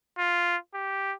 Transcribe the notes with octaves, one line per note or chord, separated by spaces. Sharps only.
F4
G4